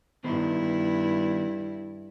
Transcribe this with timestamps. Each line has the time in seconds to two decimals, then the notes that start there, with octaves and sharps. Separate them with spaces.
0.24 G2 D#3 B3 E4 C5